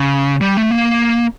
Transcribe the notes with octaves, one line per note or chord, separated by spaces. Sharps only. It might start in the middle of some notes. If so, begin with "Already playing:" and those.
Already playing: C#3
G3
A3
A#3